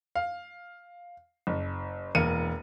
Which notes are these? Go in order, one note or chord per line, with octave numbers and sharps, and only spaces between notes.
F5
F#1
E1 A#3 C#7 D#7